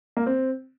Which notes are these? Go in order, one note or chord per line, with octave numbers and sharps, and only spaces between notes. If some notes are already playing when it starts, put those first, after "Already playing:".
A#3
C4